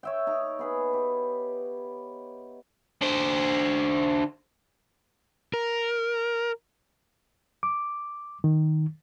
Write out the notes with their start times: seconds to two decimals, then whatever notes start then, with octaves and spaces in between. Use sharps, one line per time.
0.03 C#5 E5 G5
0.27 D#4 A#5
0.59 B3 G#4 B4
0.94 G4
3.02 D3 C5
5.54 A#4
7.63 D6
8.44 D#3